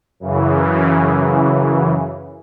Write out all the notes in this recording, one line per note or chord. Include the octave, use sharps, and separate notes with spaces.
F#2 C#3 E3